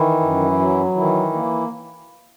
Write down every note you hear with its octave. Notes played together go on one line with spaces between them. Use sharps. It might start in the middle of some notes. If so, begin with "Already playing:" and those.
Already playing: D#3 E3 E4
F#2
F#3
D#3 E3 E4
A#3